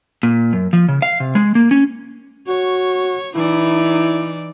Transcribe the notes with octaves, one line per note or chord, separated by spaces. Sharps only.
A#2
F#2
F3
C#3
F5
C3
G#3
A#3
C#4
F#4 C#5
E3 D#4 E4 D5